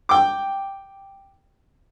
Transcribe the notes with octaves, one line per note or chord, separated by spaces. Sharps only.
G5 D6